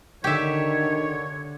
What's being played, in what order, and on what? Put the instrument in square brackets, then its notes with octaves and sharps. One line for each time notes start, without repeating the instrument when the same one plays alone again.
[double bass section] D3 [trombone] D#3 [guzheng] G4 E5 [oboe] C#5